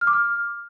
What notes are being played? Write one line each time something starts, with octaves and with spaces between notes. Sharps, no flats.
F6
D6
F6